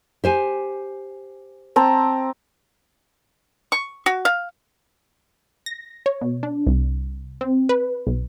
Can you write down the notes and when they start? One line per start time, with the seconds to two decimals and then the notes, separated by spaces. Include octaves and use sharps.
0.24 G4 C5 G#5
1.76 C4 A5 A#5
3.72 C#6
4.06 F#4
4.25 F5
5.66 A#6
6.06 C#5
6.21 B2
6.43 D4
6.67 C2
7.41 C4
7.69 B4
8.07 B1